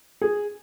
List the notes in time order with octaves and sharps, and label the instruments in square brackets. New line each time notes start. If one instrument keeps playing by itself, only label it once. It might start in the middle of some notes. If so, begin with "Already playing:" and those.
[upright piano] G#4